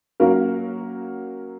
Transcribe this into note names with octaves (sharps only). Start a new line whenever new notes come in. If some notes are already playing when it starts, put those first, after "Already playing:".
F#3 A#3 C#4 F#4 A#4